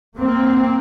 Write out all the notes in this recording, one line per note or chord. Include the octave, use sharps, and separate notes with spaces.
A#3 C4